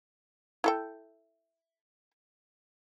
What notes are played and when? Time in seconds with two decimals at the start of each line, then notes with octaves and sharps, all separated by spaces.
0.64 E4 A4 G5